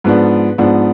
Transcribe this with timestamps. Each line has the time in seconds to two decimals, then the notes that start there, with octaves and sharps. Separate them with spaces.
0.04 G#2 F3 B3 D4 B4
0.58 G#2 F3 B3 D4